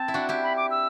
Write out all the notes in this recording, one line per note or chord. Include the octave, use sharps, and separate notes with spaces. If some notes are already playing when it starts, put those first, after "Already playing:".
Already playing: C4 A5
E4
D4 F#4
E4 G4
B5
D6
E6